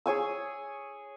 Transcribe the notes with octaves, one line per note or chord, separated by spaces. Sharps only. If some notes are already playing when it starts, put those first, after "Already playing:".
G#4 C#5 G#5 E6